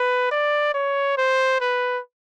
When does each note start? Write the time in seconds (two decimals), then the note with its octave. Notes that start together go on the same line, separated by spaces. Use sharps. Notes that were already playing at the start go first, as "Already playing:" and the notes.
Already playing: B4
0.31 D5
0.74 C#5
1.17 C5
1.61 B4